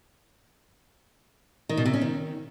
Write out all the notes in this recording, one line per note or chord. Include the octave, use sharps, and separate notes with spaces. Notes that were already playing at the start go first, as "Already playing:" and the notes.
D#3
B2
C3
C#4
D#3